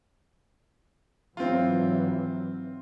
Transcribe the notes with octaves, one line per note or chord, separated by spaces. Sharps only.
G#2 E3 F#3 C4 F4